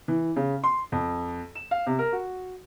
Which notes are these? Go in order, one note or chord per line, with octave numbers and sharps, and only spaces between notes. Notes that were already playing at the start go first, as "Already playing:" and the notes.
E3
C#3
C6
F2
E7
F5
C3
A#4
F#4